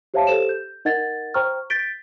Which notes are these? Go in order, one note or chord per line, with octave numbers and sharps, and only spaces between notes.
G4 C5 C#5 E5 F5 A5
G4 A4 C5 E7
G6
D#4 A#4 D#5 F#5 G#6 A6
C5 G5 A#5 C#6 F6
G6 A6 B6 D7 G7